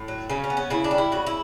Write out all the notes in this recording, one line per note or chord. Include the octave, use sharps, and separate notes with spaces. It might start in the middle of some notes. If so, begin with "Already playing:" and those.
Already playing: A2
F#3
C#3 C#4
C#4
B3
C#4
C#3 E4
D4
G3
E4
C#3 F#4
E4